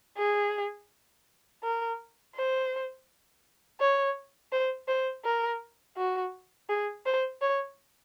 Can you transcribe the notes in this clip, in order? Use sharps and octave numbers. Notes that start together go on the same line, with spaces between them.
G#4
A#4
C5
C#5
C5
C5
A#4
F#4
G#4
C5
C#5